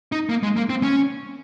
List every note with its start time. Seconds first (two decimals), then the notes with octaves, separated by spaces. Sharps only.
0.12 D#4
0.29 A#3
0.43 G#3
0.57 A#3
0.69 C4
0.83 C#4